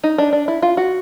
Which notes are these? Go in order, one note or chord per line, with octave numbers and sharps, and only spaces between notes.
D#4
D4
D4
E4
F4
F#4